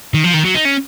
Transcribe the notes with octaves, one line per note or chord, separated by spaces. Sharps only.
D#3
F3
D#3
F#3
D#4
C#4